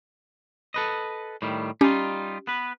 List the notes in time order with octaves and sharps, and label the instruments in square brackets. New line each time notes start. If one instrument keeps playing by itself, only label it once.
[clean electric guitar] A4 B4 D#5
A2 D#3 G3
[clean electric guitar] G3 D#4 F4 [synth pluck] C#4 G4
[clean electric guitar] B3 B4